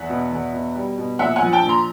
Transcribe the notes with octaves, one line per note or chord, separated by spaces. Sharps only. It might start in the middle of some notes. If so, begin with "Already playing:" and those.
Already playing: E2 E5 F#5
B2
E2
B2
G3
B2
A#1 E5 F#5
F#5 G#5
F3
G5 A5
A#1
A#5 C6